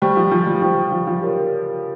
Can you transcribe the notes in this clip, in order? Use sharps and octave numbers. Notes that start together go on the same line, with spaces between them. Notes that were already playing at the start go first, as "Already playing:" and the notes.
G3 C5 G5 C#6
F3
F3
G3
F3 C5 G5 C#6
F3
F3
G4 A#4 C#5